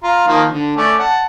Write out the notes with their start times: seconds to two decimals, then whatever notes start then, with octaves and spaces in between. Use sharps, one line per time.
0.04 F4 A#5
0.28 D#3 F3 A#3
0.51 D3
0.76 A3 C#4 D5
0.99 F#5 A5